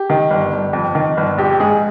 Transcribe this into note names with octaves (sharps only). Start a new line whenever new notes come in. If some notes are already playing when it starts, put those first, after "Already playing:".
Already playing: G4
D#3
G1
G1
F2
D#3
G1
A#1 G4
G#2 G#4